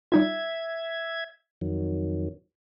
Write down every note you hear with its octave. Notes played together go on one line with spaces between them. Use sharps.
G3 D#4 F4 E5 G#6
F2 D#3 F#3